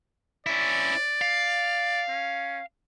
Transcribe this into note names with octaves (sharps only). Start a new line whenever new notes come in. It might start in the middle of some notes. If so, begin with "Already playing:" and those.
C#4 E4 D5
F5
C#4